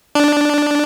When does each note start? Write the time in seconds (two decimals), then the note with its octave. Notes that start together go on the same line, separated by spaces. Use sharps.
0.15 D4